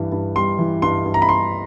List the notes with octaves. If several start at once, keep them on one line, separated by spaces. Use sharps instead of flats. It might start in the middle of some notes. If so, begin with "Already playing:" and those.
Already playing: G2 E3 G3
G2
G3 C6
E3
G2 C6
G2
A#5
B5
G3 C6